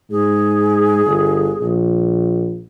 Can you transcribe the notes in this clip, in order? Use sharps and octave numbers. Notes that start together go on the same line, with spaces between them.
G#2 G#4
G1
A#1